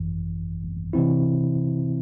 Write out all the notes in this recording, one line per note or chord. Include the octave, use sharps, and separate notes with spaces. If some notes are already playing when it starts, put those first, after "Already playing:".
Already playing: G#1 F#2 E3
C3 E3 C4 E4